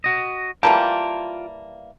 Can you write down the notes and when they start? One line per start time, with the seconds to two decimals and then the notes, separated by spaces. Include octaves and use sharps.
0.04 F#4 D#5
0.63 E3 G3 A#3 F4 G5 A5